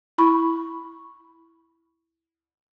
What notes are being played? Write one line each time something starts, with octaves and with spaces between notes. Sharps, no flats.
E4 B5 C#6